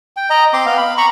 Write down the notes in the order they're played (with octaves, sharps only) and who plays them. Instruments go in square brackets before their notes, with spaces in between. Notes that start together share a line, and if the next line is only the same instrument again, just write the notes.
[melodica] G5
D#5 A#5
C4 C6 D6
B3 F5
B5
A#5 B5 C#6